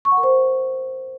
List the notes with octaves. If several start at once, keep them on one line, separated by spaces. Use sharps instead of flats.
C#6
F#5
A#4
C5